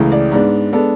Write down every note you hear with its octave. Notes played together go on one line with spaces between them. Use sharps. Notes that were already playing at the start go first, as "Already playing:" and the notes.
Already playing: C#2 C#3 E3 A3
D5
G#2 G#3 B3 D4
G#3 B3 D4 A4